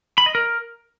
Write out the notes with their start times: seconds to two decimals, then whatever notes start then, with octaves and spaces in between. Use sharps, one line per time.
0.18 B5
0.26 D#5
0.35 A#4